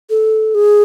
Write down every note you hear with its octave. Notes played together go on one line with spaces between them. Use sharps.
A4
G#4